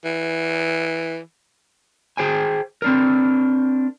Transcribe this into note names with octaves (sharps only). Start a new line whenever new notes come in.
E3
G#4 C5 G5 G#5
C4 D4 A#4